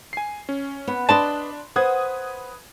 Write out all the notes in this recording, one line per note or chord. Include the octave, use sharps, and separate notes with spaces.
G#5 C7
C#4
B3
D4 B4 D5 D#5 A5 B5 C6
B4 C5 F#5 D#6 G#6